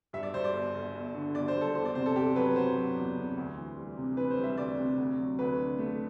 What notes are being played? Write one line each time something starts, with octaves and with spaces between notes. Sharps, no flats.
G2 E5
D5
G2 C5
D5
G1
G1
G1
D3
G1 D5
C5
G2
A4
E2 C5
D5
C3 C5
A4
C3 G4
F#3 B4
F#3 C5
F#3
E2
C3
D2
E3
G3
C3
E3 B4
C5
G3
E5
D2 D5
C3
D2
F#3
D2 B4
D3
A3